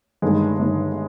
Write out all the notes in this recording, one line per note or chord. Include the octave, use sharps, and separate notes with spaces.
G1 G2 D#3 G#3
G1 G2 D#3